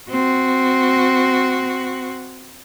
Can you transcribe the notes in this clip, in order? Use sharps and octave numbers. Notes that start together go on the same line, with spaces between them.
C4 F#4